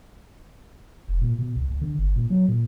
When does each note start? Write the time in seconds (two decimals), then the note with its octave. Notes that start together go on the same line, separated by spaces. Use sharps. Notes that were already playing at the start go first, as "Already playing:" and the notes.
1.08 E1
1.21 A#2
1.39 B2
1.56 C#2
1.70 D2
1.82 D3
1.99 G1
2.16 A#2
2.30 F#3
2.48 A#2